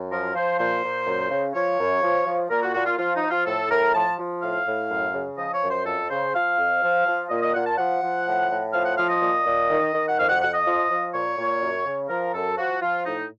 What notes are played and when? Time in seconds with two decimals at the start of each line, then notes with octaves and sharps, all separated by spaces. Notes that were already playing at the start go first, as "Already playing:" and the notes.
Already playing: F#2
0.10 F3 A#4
0.34 F3 C5
0.58 A#2 C5
0.83 A#2
1.06 F#2
1.31 C#3
1.55 F3 C#5
1.79 F#2
2.03 F3
2.26 F3
2.50 A#2 A#4
2.62 F#4
2.74 A#2 F#4
2.86 F4
2.98 F3 F4
3.15 D#4
3.22 F3
3.30 F4
3.46 A2 A4
3.70 A2 A#4
3.94 F3 A5
4.18 F3
4.42 A2 F5
4.66 A2
4.90 F#2
5.14 C#3
5.38 F3 D#5
5.54 C#5
5.63 F#2
5.71 C5
5.86 F2 A4
6.10 C#3 C5
6.34 F3 F5
6.58 F2
6.83 F3
7.06 F3
7.29 A#2 D#5
7.42 D#5
7.53 A#2 F#5
7.66 A5
7.77 F3 F#5
8.02 F3
8.26 A2
8.50 A2
8.73 F3 F5
8.85 F#5
8.97 F3 F5
9.09 D#5
9.22 A#2
9.46 A#2
9.70 D#3
9.94 D#3
10.08 F#5
10.18 F2 F5
10.29 F#5
10.41 F2 F#5
10.53 D#5
10.65 F3
10.89 F3
11.14 A#2 C#5
11.38 A#2
11.62 F#2
11.86 C#3
12.09 F3 A#4
12.34 F#2 A4
12.58 F3 F#4
12.81 F3 F4
13.05 A2 D#4